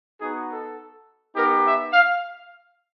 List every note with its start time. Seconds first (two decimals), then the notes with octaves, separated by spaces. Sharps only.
0.21 B3 D#4 F#4 G#4
0.50 A4
1.36 B3 D#4 G4 A#4
1.65 E5
1.93 F5